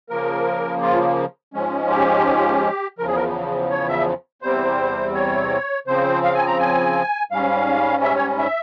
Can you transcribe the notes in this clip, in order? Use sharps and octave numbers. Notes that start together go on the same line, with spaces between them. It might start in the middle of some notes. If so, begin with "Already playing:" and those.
C#3 F3 A#3 A#4
F4
G#2 F3 G#3 C#4
G4
E2 C#3 F3 A#4
G#4
A#4
C#5
E5
E2 C3 G3 C4 C5
C#5
C#3 F3 C4 C5
F5
G#5
A#5
G#5
G#2 G3 C#4 F5
E5
C#5
E5